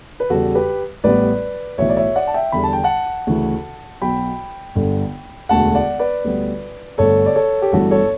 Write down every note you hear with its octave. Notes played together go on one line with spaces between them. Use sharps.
B4
E2 C#3 G3 F#4 A4
G4 B4
A1 A2 G3 B3 B4 D5
B1 A2 E3 C#5 E5
D5
C#5 E5
D5 F#5
A5
E5 G5
E2 D3 G3 B5
A5
G5
F#5 A5
D2 C#3 E3
B1 B2 F#3 G5 B5
G1 G2 D3
E1 D2 D3 A3 F#5 A5
D5 F#5
B4 D5
D2 D3 G3 B3
G1 G2 D3 A3 A4 C#5
D5
A4 C#5
G4
G1 G2 E3 A3 F#4 A4
A4 C#5